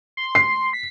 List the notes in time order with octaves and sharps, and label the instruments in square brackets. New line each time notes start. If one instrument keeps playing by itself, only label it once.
[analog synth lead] C6
[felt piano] C7
[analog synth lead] B6